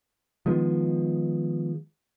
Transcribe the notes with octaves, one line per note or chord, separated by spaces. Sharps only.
D#3 F3 G#3 B3